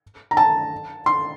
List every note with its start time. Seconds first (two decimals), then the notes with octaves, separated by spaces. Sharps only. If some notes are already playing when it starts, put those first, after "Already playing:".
0.31 A#5
0.37 A5
1.06 C6